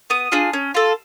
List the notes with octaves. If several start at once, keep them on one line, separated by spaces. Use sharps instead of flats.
B3 D#6
D4 F4 G#4
C#4
F4 A4